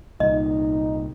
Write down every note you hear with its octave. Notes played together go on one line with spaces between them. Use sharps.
C2 A#2 D#4 D#5